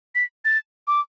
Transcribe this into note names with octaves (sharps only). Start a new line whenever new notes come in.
B6
A6
D6